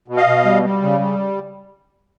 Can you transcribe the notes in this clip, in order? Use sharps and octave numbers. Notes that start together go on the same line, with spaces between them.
B2
D#5 F5
B2
G3
G3
C#3
G3